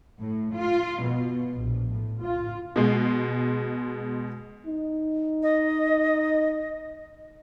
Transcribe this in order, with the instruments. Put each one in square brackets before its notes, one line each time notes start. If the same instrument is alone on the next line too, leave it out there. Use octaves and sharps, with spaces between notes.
[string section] A2
F4
B2
A#1
A2
F4
[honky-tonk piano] B2 G#3
[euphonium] D#4
[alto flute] D#5